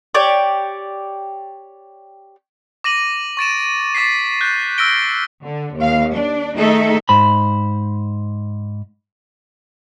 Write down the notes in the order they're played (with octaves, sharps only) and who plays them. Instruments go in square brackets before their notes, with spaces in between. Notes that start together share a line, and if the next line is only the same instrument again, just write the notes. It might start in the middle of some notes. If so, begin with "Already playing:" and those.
[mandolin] G4 C#5 D5
[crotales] D6 A#6 D#7 F#7
C#6 A6 D7 E7
D6 A6 B6 C7
F#6 G6
E6 F6 A#6 D7 G7
[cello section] D3
D#2 F5
D4
D#3 A3 D#4 G#4 A4 E5
[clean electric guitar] G#2 C5 B5